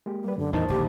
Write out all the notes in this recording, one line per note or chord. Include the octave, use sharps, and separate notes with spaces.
G#3 A#3 G4
G3 A#3 B4
F#2 D3
E2 A2 D#3 D#4 C5 A5
A#1 D#2 D3 G4